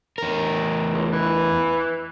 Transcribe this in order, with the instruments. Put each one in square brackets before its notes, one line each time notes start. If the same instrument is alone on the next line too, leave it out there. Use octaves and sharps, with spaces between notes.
[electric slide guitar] E2 A#4
[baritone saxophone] C#2
E3